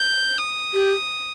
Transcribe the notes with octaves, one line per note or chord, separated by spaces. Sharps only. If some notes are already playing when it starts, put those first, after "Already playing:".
Already playing: G6
D#6
G4